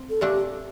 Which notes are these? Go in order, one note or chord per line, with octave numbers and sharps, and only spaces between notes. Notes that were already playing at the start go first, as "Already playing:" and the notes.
Already playing: C4
A4
A#2 A3 D4 G4